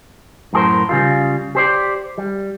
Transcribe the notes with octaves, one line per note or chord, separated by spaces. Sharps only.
F#2 A2 G#4 A#4 C5
C#3 G3 F4
G4 C5 D5
G3